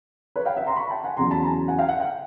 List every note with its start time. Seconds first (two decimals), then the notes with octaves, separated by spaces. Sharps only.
0.36 B4 C#5
0.45 F5 G5
0.57 E5 F#5
0.67 A#5 C6
0.76 B5 C#6
0.91 G5 A5
1.04 F#5 G#5
1.17 E2 C#3 F#3 A#5 C6
1.31 A5 B5
1.45 G#5 A#5
1.68 F#5 G#5
1.78 F5 G5
1.89 E5 F#5
1.99 F5 G5